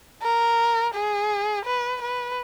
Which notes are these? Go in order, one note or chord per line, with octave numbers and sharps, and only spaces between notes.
A#4
G#4
B4
B4